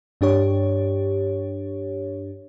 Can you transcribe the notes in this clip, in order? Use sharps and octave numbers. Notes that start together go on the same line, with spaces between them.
G2 D4 G4 C#5